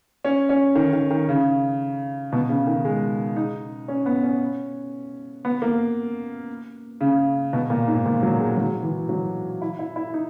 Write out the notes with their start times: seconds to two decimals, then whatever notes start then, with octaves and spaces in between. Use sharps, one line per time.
0.25 C#4
0.49 C#4
0.75 D#3
0.93 D#3
1.11 D#3
1.29 C#3
2.32 B2
2.49 C#3
2.67 D#3
2.85 G#3
3.36 D#4
3.88 C#4
4.06 B3
4.24 C#4
5.45 B3
5.62 A#3
7.01 C#3
7.53 B2
7.70 A#2
7.88 G#2
8.06 A#2
8.23 F#3
8.40 G#3
8.57 F#3
8.83 E3
9.09 F#3
9.62 E4
9.79 E4
9.96 E4
10.14 D#4